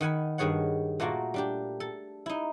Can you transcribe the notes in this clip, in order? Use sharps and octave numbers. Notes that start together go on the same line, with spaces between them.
D#3 F#5 G#5 B5
G2 D#3 G#4 C#5 F#5
A#2 A3 A#3 F#4
G3 D4 G4
A4
D#4 E4